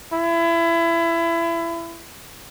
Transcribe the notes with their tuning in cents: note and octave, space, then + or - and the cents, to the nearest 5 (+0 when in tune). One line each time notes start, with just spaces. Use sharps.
E4 +25